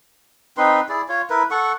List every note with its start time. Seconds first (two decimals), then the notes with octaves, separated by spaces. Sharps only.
0.57 C4 D#4 B4 C6
0.89 E4 G#4 D5
1.08 F4 C#5
1.30 E4 A#4 B4
1.51 A4 F#5 C#6